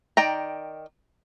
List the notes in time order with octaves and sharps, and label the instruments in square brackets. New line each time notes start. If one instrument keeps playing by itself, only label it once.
[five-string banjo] D#3 D5 G5 A#5